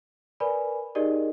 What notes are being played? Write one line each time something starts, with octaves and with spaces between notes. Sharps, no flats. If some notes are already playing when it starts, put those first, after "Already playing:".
A#4 B4 D5 G#5 B5
D#4 G4 G#4 A#4 D5 D#5